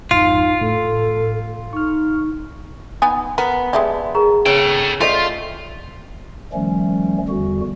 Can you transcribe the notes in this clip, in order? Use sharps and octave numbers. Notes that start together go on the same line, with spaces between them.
G#1 F2 G#2 D#4 F4
A2 A4
D#4 C#6 F6
B3 D#4 G#5
B3 A#4
G#3 A3 G4 D5 E5 G#5
G#4 A#4 A#5
C#3 A4 B4 C#5 G5
A3 F4 C5 D5 D#5
D#3 F3 G3 A3 C#4
E2 D3 G3 F#4